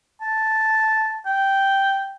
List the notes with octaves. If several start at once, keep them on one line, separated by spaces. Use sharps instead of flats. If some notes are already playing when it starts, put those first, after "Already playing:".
A5
G5